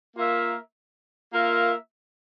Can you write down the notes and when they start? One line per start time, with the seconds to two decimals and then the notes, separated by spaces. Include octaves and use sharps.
0.15 A#3 F4 A#4 E5
1.33 A#3 F4 A#4 E5